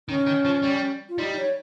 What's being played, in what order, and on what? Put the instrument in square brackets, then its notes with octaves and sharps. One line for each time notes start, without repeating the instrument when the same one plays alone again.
[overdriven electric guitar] D#3 [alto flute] C#4
[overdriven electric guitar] D#3
F3
G3
[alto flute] F4
[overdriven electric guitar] G3 [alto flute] D#4
[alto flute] C#5